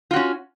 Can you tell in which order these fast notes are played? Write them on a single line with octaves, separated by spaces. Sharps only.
F4 F#4 C#4